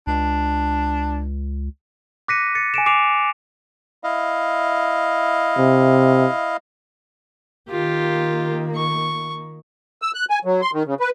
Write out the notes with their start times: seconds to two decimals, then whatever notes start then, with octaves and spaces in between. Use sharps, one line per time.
0.07 C#2 D4
2.28 D6 F#6 A#6 B6 C#7 D#7
2.55 A6 C#7
2.74 G#5 A6 D7 E7
2.86 D6 C7 D7 F7
4.04 E4 D#5 F5
5.58 C3
7.70 D#3 A#3 F4 G4
8.76 C#6
10.02 E6
10.14 F#6
10.30 G#5
10.45 F#3
10.62 C6
10.73 D#3
10.86 C#3
11.00 B4